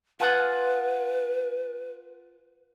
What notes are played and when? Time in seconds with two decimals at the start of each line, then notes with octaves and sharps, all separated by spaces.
0.20 F4 G#4 B4 F#5